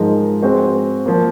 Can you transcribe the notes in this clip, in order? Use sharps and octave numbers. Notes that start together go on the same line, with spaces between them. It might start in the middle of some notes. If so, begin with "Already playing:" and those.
Already playing: G#2 F3 G#3 D#4 A#4
G#3 C4 F#4 C5
F3 A#3